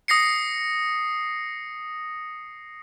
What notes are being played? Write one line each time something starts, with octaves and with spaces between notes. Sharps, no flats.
D#6 A#6 C7 C#7